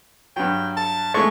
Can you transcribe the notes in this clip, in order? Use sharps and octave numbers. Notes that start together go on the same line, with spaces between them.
G2 F#3 G5
A5
G#3 A3 C#6